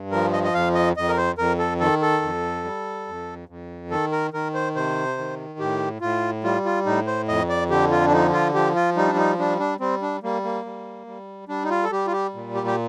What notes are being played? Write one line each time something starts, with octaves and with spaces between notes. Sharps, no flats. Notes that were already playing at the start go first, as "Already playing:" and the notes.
Already playing: G2
F3 A#4
D#5
D#5
F2 F5
D#5
F2 D#5
A#4
C5
F2 A#4
A4
D#3 A4
A4
F2
G3
F2
F2
D#3 A4
A#4
D#3 A#4
C5
C3 C5
D#3
A2 G4
A2 F4
G3 F4
F4
A2 D#4
C5
F2 D#5
D5
D3 G4
F4
D4
F3 D#4
F4
F3 G4
F4
G3 D#4
D4
D#4
G3 D4
D4
G3 C4
D4
G3 A#3
A#3
G3
G3
G3 D4
D#4
F4
A4
G3 G4
F4
G4
A#2
G4
G4